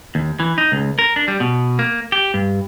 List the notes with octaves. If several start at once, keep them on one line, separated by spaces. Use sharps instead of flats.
D#2
E3
D#4
C#2
A#4
D4
G3
B2
A#3
G4
G2